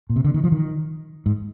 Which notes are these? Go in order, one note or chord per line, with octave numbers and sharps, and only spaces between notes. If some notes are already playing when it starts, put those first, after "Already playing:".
A#2
C3
D3
D#3
F3
D#3
G#2